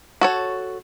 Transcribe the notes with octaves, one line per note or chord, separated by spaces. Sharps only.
F#4 A4 C#5